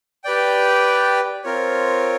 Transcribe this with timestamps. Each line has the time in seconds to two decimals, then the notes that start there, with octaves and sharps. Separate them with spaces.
0.24 G4 B4 D5 G5
1.44 C4 F4 A#4 C#5